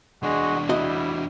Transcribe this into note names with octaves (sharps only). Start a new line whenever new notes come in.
E2 G#3 D4 F#4
C#2 G3 E4 F#4 D#5